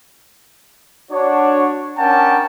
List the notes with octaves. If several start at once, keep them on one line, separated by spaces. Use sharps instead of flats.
D4 F#4 C#5
C#4 D4 A#4 F#5 G5 A5